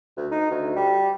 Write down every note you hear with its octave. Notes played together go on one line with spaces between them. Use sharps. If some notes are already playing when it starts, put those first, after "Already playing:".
D2
D#4
D2
G3